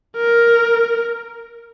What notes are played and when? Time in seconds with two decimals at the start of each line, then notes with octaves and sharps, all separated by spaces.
0.17 A#4